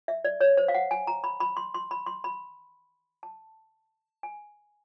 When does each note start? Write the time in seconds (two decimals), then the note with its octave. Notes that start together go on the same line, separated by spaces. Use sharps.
0.08 E5
0.25 D5
0.41 C#5
0.57 C5
0.68 F5
0.74 F#5
0.91 G#5
1.07 A#5
1.24 B5
1.40 B5
1.57 C6
1.74 C6
1.91 B5
2.06 C6
2.24 B5
3.23 A5
4.23 G#5